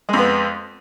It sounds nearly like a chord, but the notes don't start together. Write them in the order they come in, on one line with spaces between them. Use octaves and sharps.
G#3 F2 B3